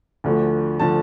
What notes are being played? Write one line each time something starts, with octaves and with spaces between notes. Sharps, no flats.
D2 D3 F3 A3
D3 F3 A3 A5